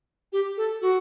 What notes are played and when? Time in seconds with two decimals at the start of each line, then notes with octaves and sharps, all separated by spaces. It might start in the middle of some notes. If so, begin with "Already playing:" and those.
0.33 G4
0.57 A4
0.82 F#4